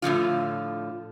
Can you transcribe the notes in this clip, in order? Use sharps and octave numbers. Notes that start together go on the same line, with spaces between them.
A2 D3 F3 F4